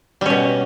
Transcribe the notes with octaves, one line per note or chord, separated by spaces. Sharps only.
B2 G3 C#4